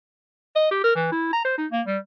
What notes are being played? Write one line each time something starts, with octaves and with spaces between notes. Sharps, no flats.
D#5
G4
A#4
E3
E4
A#5
C5
D#4
A#3
G3